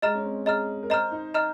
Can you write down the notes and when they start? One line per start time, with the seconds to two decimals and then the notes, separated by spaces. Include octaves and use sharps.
0.02 G#3 D#5 A#5 F6
0.14 C#4
0.24 C4
0.46 G#4 D#5 A#5 F6
0.83 A#4
0.90 C5 D#5 A#5 F6
1.11 D#4
1.34 D#5 A#5 F6